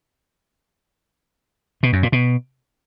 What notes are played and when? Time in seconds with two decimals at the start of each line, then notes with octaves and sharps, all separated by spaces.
1.83 B2
1.93 F#2
2.03 A#2
2.12 B2